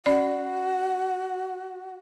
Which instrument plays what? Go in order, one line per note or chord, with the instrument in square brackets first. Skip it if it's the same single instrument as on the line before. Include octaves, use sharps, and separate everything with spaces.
[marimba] C#4 D5 [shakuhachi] F#4